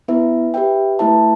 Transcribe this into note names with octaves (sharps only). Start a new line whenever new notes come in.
B3 E4 B4 E5
G4 B4 E5 G5
A3 E4 B4 E5 A5